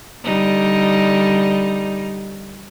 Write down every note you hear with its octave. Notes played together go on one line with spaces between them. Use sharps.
D3 G3 D#4